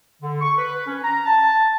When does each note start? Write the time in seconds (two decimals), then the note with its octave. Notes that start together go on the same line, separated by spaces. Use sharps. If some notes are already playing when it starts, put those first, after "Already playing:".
0.22 D3
0.41 C#6
0.58 B4
0.87 C#4
1.04 A#5
1.26 A5